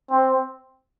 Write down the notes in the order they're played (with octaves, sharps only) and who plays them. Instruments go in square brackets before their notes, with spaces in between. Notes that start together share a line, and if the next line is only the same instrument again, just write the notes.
[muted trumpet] C4